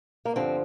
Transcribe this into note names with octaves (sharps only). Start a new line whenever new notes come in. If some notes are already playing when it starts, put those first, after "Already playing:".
A#3
G2 D3 F3 C4